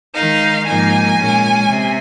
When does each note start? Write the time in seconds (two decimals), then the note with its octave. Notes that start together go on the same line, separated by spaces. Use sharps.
0.15 D#3 G#3 D#4 F5
0.66 G#2 F3 A#3 D#4 G#5
1.18 A#2 G#3 C#4
1.69 C3